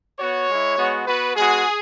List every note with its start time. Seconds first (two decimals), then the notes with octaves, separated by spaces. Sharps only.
0.19 B3 F#4 C#5
0.48 G#3 E4
0.77 G#3 B3 F#4
1.06 B3 F#4 B4
1.36 G#3 B3 F#4 G#4